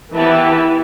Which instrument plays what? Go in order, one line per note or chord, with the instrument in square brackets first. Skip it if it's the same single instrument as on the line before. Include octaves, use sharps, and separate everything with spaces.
[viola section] E3 [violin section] B3 G4 B4 E5 A5